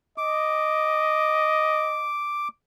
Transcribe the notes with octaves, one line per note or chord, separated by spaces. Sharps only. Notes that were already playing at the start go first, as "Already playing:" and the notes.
D#5 D6